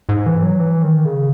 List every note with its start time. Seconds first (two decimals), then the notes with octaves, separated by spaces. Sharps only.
0.09 G#2
0.26 E3
0.43 F#3
0.60 E3
0.83 D#3
1.05 C#3